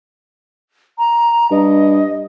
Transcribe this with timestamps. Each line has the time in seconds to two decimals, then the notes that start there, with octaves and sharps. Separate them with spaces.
0.98 A#5
1.51 G2 D#5